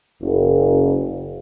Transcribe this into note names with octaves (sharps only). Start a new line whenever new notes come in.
F#1